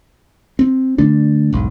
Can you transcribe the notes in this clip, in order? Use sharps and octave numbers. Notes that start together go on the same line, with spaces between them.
C4
D3 A3 D4
E1 B1 G#2